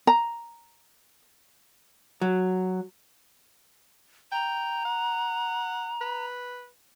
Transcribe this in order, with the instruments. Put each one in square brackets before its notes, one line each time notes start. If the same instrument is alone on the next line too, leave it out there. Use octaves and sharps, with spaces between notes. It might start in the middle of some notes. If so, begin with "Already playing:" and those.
[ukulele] A#5
[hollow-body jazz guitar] F#3
[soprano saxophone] G5 [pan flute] A#5
[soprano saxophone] F#5
B4